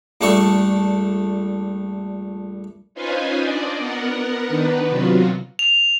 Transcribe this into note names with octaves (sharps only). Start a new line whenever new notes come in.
A#1 G3 A3 D4 A4 C#6
C#4 D#4 F4 B4 C5 G#5
D4 D5 D#5
B3 A#4 F#5
D#3 B3 D4 D#4 B4
C3 F#3 F4 F#4
F7